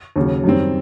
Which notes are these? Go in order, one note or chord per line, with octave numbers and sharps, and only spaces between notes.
D#2 C#3 F#3
F#2 D#3 G3 C4